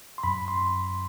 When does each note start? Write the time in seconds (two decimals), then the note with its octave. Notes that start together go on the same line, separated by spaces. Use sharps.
0.18 C6
0.24 F#2 B5
0.48 C6